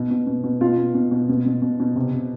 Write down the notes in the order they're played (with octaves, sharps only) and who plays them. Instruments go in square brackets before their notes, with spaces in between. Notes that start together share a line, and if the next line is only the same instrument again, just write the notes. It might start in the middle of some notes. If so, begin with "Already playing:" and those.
Already playing: [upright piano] B2
B2
B2
B2
B2 F4
B2
B2
B2
B2
B2
B2
B2
C3
C3